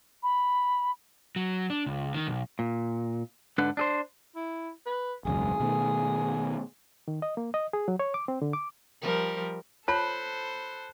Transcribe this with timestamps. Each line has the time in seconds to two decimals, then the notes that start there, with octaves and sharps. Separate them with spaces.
0.23 B5
1.36 F#3
1.70 D4
1.86 C#2
2.15 D#3
2.27 B1
2.59 A#2
3.58 G#2 D3 D4 B4 F#5
3.77 D4 G#4 C5
4.35 E4
4.86 B4
5.25 E1 C#2 F#2 G#4
5.60 B2 D#3 A3
7.08 D#3
7.22 D#5
7.37 A#3
7.54 D#5
7.73 G#4
7.88 F#3
7.99 C#5
8.14 D6
8.28 C4
8.42 D3
8.53 D6
9.01 F3 G3 A#4
9.88 F4 A4 C5 C#5 A5 B5 F#6